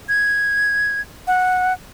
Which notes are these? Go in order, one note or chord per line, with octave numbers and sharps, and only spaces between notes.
G#6
F#5